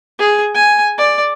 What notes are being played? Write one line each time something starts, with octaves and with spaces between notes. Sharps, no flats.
G#4
G#5
D5